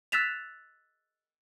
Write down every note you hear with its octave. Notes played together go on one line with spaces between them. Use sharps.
E6 F#6 A6 B6 E7 F7